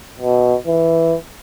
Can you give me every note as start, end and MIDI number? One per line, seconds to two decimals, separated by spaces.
0.19 0.55 47
0.67 1.16 52